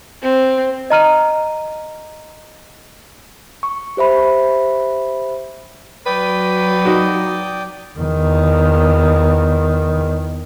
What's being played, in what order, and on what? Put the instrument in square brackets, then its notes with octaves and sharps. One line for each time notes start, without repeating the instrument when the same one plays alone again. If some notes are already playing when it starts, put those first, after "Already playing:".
[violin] C4
[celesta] D#5 A#5 F6 D#7
[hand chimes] C#6
G4 C5 E5 B5
[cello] F#3 [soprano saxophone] B4 [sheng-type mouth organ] D5 G5 D#6
[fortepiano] D#4 F#4
[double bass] E2 D#3